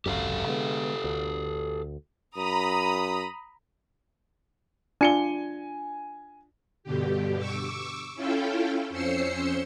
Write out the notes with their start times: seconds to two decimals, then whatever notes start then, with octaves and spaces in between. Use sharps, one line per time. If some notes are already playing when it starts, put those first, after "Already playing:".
0.06 G#1 C#2 F#2 G4 A4 F5
0.47 D3 G#3 B3
1.04 D2
2.37 F#2 A#5 B5 D#6
5.01 D4 F4 G#5 C#7 G7
6.84 G2 B2 D3 G4
7.38 C#6 D6 E6
8.15 C#4 E4 F4 A4 F5 G5
8.90 F2 C#4 C5 C6 E6 C#7